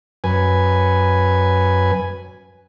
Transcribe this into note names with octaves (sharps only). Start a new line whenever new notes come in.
F#2 B4 G#5